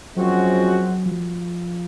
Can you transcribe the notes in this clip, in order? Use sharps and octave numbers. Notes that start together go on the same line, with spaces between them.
F#2 F3 F#3 G#3 C4 F#4
F3